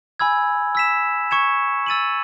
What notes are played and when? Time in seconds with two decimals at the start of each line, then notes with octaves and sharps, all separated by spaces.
0.20 G#5 B5 E6 G#6
0.75 E6 B6 E7
1.31 C#6 G#6 C#7 E7
1.86 E6 A6 D#7 F#7